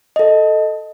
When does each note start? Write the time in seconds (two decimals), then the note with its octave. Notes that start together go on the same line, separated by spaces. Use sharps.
0.16 A4 D#5